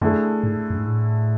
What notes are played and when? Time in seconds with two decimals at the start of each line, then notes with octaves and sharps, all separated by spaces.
0.01 F#2 D3 A3 E4 G#4
0.44 G#2
0.70 F#2
0.78 G#2
0.87 A2